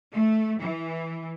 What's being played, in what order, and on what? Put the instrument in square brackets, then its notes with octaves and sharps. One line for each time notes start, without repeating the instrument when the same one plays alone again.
[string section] A3
E3